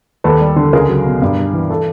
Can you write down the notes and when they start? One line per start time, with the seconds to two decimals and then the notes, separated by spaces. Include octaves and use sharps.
0.24 D#2 A4 B4
0.41 G3
0.56 D3
0.73 C#2 G#4 A#4
0.88 F#3
1.06 B2
1.22 G2
1.38 G3
1.53 E3
1.70 A4